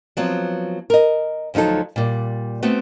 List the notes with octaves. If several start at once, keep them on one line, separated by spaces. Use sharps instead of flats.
F3 F#3 B3 C4
A#4 D#5
D2 F3 F#3 D#4 A4
A#2 G3
A3 B3 C4 F#4